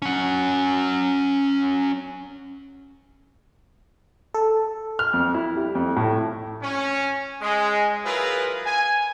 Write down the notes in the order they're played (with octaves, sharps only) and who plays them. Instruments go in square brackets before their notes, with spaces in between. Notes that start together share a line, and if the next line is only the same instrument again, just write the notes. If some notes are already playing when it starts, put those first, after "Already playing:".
[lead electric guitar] C#4 F#5
[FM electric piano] A4
[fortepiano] F6
F2
E4
G3
F2
A2
[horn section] C#4
G#3
F#3 E4 F4 G#4 A#4 B4
G#5